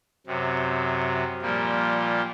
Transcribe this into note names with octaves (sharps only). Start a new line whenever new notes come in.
F#2 C3
A#2 F3 G3 A#3